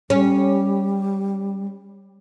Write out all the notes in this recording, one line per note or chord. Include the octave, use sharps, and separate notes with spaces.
G3 C#4